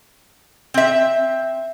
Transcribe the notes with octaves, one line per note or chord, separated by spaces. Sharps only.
C4 E5